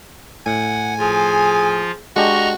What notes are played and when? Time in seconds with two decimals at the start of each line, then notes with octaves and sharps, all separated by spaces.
0.46 A2 F#5 G#5
0.98 F3 F4 G#4
2.16 G#3 D4 F#4 G4 D#5 A#5 C#6